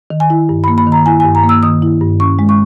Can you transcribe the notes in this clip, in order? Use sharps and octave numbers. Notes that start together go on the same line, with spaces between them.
D#3
G#5
E4
G2
B5
A#3
B5
D#3
A#5
E4 G#5
G#5
G2
A#5
A#3
E6
D#3 D#6
E4
G2
C#4 C#6
G#3
C#6